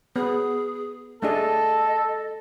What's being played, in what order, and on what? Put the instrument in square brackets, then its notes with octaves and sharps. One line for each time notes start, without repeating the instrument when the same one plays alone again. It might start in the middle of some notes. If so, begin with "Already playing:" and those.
[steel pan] B3 [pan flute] G#4
[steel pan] A3 D4 G#4 [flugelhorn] A4 [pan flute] D#5